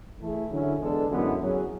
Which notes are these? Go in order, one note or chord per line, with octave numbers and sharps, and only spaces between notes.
E3 A3 E4 G#4
D3 F#3 C#4 E4
E2 D3 G#3 D4 A4
F#2 D3 G#3 B3 E4
F#3 C#4 G#4